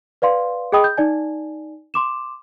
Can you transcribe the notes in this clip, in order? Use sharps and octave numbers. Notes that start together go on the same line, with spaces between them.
B4 D5 F5 C6
G#4 D#5 G5 B5 D#6
G6
D#4 D5 G#5
C6 D6 E7